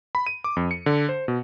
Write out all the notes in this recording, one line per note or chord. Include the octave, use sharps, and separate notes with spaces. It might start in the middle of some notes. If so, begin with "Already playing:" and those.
B5
D#7
D6
F2
C#7
D3
C5
B2